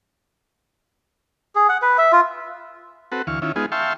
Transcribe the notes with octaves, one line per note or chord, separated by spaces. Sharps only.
G#4
F#5
B4
E5
F4
C4 F#4 A4 B4
D2 E3 F5 C#6
D#3 C#4 E4 F4
G#3 B3 D#4 F4 G#4
E5 F5 G5 A5 C6 C#6